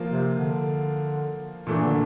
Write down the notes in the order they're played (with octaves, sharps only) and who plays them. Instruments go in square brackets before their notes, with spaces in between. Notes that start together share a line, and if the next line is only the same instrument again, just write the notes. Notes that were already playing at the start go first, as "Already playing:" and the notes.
Already playing: [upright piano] F3 A#3 F4
[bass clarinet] C3
D3
[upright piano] A#2 A3 D4 [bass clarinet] E3
[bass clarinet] D3